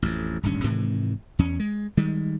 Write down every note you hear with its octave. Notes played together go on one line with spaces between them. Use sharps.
A1 F2
D1 G#1 G2 C#4
G#2 C3 D#3 E3
E2 C#4
G#3
D#3 G3 G#3